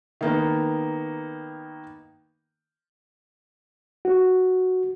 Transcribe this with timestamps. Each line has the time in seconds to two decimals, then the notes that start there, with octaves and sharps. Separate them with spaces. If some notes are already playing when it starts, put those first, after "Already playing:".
0.21 D#3 A#3 B3
4.05 F#4